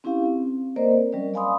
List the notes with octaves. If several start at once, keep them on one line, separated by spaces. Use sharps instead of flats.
C4 C#4 E4 G4 F5
C4
A#3 C4 A#4 C5 D5 D#5
A#4
F#3 G3 C#4 D5
D5 F5 G#5 B5 C6 D#6